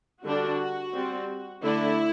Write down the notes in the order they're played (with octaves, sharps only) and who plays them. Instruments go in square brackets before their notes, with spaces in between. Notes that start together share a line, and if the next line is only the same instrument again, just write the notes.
[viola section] D3 G3 D4 F#4
G3 C4
D3 A3 D4 E4